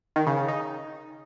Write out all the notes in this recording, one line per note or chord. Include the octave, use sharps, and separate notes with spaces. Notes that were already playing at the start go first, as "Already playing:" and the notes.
D#3
C#3
C#3
D#4